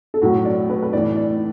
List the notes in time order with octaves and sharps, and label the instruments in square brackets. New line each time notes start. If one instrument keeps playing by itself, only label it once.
[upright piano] A4
A2 F#3 F#4
D5
B4
B4
A2 E3 D5
D5